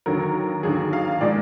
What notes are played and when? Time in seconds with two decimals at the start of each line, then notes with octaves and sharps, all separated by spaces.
0.06 D#2 D3 F#3 A#4
0.63 D#2 D3 F#3 G#4
0.93 F5
1.21 A#2 F3 G#3 D5